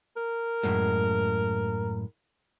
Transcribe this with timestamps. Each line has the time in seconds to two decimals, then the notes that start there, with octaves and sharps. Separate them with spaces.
0.17 A#4
0.63 F#2 A2 G#3